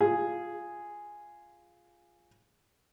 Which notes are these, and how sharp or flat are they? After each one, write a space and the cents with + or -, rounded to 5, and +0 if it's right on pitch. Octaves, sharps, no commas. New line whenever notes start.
F4 +0 G#4 +0